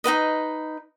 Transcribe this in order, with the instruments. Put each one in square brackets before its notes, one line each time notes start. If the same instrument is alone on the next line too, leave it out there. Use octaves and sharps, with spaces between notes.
[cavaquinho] D#4 F#4 B4 D#5